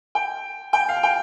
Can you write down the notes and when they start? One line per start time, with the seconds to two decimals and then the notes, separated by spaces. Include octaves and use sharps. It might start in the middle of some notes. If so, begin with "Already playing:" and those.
0.15 G5
0.73 G5
0.89 F5
1.03 G5